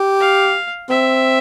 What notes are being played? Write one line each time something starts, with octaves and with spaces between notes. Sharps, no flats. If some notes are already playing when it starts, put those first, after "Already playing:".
Already playing: G4
F5
C4 E5